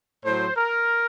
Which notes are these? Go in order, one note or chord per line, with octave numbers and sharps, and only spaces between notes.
A2 F#3 C5
A#4